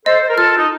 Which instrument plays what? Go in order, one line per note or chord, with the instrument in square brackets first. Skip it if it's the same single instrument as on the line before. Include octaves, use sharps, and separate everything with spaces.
[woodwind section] A4 C5 [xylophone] D#5
[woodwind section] C5
A#4
[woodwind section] F4 A4 [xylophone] F6
[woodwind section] D#4